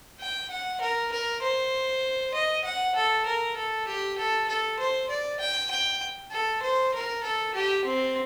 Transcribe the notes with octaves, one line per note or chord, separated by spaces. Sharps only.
G5
F#5
A#4
A#4
C5
D#5
F#5
A4
A#4
A4
G4
A4
A4
C5
D5
G5
G5
A4
C5
A#4
A4
G4
C4